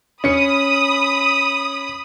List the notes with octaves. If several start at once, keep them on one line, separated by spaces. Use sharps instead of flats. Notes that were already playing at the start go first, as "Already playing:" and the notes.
C#4 B5 D#6 C#7